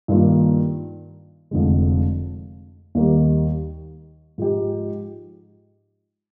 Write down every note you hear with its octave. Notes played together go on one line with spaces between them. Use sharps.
G2 D#3 A#3 F4
F1 F2 D3 G#3
D#2 D#3 G3 A#3 D#4
G#2 F3 G#3 D#4 G4